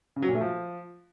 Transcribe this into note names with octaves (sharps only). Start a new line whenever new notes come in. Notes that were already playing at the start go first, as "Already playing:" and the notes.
C#3
F#3
A#2
A3
F3